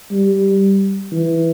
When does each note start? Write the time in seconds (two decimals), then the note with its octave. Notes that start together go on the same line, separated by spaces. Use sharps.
0.11 G3
1.12 E3